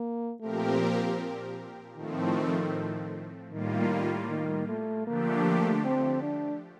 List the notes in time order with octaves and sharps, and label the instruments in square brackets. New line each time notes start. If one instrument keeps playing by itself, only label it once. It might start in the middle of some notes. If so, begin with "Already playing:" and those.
Already playing: [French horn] A#3
[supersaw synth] A#2 F3 C4 G4 A#4 [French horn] A3
[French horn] A#3
[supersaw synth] A2 F3 A3 C4 [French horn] D#3
[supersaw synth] A2 G3 A#3 F4 [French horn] D#3
[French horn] D#3
A3
[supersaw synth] D3 F3 A3 D4 G4 [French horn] A#3
[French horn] C4
D4